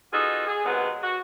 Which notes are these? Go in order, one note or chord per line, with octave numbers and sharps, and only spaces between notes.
B3 D#4 F4 F#4 G#4 A4
G#4
C3 D#3 F#3 G#3 B3
F#4